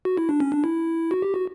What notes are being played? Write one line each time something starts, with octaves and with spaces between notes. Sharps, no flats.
F#4
E4
D4
C#4
D4
E4
F#4
G4
F#4